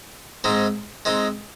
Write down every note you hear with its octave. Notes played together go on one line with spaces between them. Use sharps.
G#2 G#3 C4 D#4
G#3 C4 D#4